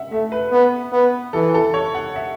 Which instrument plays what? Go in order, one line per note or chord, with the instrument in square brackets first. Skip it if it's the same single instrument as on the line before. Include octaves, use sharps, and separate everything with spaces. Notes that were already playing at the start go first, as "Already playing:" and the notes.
Already playing: [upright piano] E5 F#5
[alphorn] A3 [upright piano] E5
[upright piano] B4
[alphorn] B3
B3
[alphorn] E3 [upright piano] A4
[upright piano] A4
C#5
F#5
E5